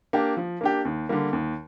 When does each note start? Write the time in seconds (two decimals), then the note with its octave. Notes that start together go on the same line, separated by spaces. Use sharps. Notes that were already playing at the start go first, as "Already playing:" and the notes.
0.13 A#3 D4 G4
0.37 F3
0.61 A#3 D4 G4
0.85 D#2
1.09 D3 G3 A#3
1.33 D#2